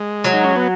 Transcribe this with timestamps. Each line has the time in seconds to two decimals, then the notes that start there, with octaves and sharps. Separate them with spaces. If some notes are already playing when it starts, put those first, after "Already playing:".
Already playing: G#3
0.24 F#3
0.33 D#4
0.44 C#4
0.56 B3